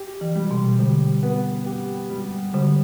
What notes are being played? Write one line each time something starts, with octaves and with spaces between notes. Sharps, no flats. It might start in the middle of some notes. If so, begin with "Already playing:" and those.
Already playing: G4
E3
G3
B2
D3 G3
B3
G4
G3
D3 G3